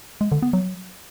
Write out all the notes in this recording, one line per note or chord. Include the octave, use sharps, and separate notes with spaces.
G#3
D3
B3
F#3